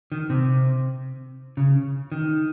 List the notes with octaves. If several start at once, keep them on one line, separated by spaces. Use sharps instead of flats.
D#3
C3
C#3
D#3